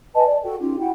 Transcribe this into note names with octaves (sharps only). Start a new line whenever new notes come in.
B4 D#5 G#5 A5
D5
F#4 A4 G5
C#4 D#4 F4 G4
E4 F#4 F#5 G5